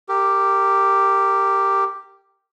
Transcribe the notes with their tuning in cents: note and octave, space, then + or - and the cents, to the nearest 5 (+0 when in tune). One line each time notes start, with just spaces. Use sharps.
G4 +0 A#4 -25